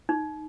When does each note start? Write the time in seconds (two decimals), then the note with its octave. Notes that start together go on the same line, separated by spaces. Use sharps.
0.09 D#4